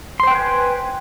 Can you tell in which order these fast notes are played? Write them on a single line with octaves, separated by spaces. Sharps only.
C6 C5 G5 B4 G#5